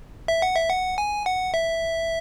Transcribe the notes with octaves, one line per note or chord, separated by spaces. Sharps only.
E5
F#5
E5
F#5
G#5
F#5
E5